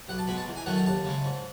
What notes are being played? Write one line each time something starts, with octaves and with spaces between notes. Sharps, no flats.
B1 F#5
A5
B2 G#3 B5
A5
E2
G#5
D#3 F#3 A3 F#5
A5
D#2 A5
C#3 G#3
G#2